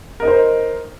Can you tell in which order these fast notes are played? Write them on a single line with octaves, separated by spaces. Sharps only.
A#4 D#5 D#4 C5